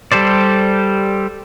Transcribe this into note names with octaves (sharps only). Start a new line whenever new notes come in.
G3 G4 A4 C5 D5